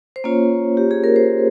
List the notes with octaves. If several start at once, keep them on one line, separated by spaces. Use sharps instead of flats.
C5
A#3 C#4 F4 C#5
G4
G#4
A#4
C5